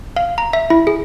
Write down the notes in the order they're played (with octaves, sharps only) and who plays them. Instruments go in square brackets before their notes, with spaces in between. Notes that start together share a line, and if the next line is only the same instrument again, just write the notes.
[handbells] F5
A#5
E5
E4
G#4